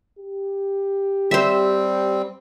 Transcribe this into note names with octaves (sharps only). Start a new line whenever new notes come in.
G4
G3 C4 C5 E5